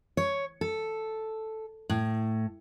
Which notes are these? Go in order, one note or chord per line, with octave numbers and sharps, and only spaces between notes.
C#5
A4
A2